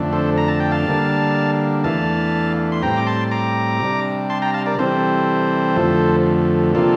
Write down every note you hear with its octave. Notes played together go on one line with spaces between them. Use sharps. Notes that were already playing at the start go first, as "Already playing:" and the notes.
Already playing: F2 D3 A3 D4
A4 C5
A#5
A5
G5
F5 A5
D3 G3 A#3 D4
E2 E3 A3 D4 F5 A5
C6
A2 G3 C4 G5 A#5
D6
A5 C6
A#5 D6
C3 G3 D4
A5 C6
G5 A#5
F5 A5
A#4 D5
C3 E3 G3 C4 A4 C5
F2 D3 F3 A3
C3 F3 A#3 D4 F4 A4